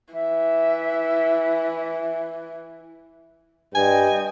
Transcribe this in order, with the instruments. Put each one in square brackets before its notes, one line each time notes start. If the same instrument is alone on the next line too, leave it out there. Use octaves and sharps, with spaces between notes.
[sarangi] E3 [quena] E5
[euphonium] G2 [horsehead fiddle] D#5 G5 [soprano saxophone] G#5